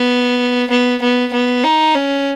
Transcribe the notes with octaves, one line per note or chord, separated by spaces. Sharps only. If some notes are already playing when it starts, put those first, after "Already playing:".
Already playing: B3
B3
B3
B3
D#4
C#4